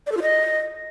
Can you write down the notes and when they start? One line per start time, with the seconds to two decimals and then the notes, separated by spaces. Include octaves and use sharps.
0.07 D5
0.12 A4
0.17 F4
0.22 D#5